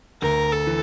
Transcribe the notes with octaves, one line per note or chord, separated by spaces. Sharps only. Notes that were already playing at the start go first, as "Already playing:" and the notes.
D2 A#4
A4
E3